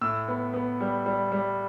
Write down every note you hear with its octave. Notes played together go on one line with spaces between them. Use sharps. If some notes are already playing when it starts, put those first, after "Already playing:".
A2 E6
B3
B3
G3
G3
G3